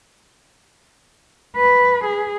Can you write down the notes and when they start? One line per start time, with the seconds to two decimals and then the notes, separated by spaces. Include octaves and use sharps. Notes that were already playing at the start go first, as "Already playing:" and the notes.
1.56 B4
2.04 G#4